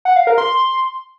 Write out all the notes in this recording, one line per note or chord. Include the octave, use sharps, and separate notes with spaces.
F#5
F5
A#4
C6